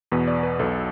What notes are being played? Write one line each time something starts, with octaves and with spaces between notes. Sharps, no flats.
E2 B2 B4
D5
B4
B1 B2 A4